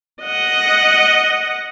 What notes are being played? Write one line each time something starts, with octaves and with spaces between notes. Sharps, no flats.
D#5 F#5